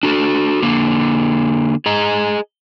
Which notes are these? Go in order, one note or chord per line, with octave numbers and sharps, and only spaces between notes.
D4 F#4 A4
D3 A#3
G#4 D#5 A#5